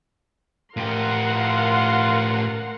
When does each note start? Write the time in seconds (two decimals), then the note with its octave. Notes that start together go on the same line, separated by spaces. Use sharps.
0.77 A2 F4 G4 A#4 F#5 C6
1.35 F4